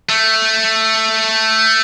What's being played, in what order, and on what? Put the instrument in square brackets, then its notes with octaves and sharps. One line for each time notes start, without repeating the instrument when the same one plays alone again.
[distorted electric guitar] A3